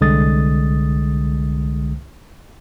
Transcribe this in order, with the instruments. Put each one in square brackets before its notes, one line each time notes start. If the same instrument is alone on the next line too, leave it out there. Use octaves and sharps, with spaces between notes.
[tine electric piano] C2 D3 G#3 D#6 A6